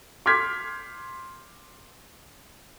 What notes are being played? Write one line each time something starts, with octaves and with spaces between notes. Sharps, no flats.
C6 D6 F6 G6 G#6 B6